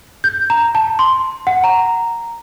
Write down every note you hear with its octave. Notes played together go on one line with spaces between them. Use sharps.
G6
A#5
A5
C6
F#5
A#5